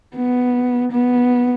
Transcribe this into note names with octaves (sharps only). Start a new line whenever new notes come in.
B3
B3